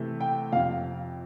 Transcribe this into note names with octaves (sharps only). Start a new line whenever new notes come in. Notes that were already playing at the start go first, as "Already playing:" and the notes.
Already playing: C3 E3 A3
G5
F2 C3 F3 F5